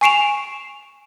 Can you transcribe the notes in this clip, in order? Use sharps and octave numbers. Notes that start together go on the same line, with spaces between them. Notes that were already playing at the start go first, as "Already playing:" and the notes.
G#5 C#6 C7 D7 E7 F7